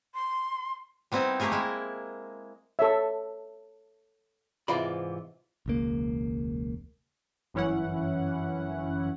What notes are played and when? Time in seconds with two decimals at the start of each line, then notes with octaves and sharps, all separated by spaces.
0.15 C6
1.12 G3 B3 C4 D#4 E4
1.40 A3 A#3 G4 G#4 A#4
1.52 G#3 E4
2.79 A4 C#5 E5
4.68 G#2 C3 E3 F4 D5 B5
5.66 E1 C#2 A#3
7.54 G1 F#2 E3 C#4 E4 F#5